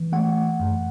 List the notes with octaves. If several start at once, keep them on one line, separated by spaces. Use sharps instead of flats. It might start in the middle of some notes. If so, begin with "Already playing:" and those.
Already playing: E3
A3 F#5
F#2